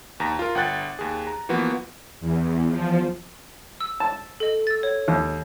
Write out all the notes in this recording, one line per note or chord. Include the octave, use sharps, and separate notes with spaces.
D#2 A#5 A#6
F4 A#4
G1 F#5 G5 F#6 A6
D#2 G#4
A#5
E3 F3 A#3 B3 F#4
E2
F3
E6
A5 E7
A4 D#5
E6 A6
C#5
D#2